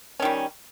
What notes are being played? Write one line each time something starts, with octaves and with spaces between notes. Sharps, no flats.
D#3 G3 C#4